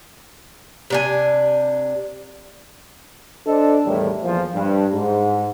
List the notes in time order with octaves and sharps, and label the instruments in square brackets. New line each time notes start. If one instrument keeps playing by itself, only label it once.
[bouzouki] C3 D4 G#5
[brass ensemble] D4 A4 C5 D#5
E2 A2 D#3 G3
E2 A#2 F3
G2
G#2